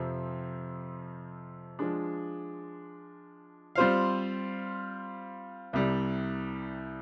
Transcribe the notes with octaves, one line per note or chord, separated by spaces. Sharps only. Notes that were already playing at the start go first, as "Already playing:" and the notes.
Already playing: F2 C3 F3 C4
F3 G#3 D4
G3 C4 F4 C5 F5
C2 C3 G3